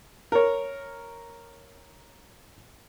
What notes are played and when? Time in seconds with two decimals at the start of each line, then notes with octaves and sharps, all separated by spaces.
0.32 A#4 C#5